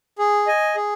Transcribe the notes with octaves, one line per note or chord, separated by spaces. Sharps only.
G#4
D#5 G#5
G#4